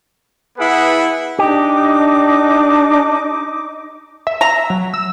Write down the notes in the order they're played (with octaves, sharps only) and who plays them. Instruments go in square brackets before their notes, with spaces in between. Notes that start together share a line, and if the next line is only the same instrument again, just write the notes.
[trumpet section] B3 E4 G#4 B4 F#5
[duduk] D4 [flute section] D#4 D6 [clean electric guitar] G4
[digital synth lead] E5
[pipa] A#5
[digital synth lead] F#3
E6